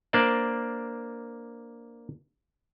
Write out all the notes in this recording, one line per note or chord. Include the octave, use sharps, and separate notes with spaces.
A#3 D4 C5 D5